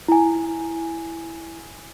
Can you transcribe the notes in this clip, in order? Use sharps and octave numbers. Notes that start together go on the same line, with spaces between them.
E4 G#5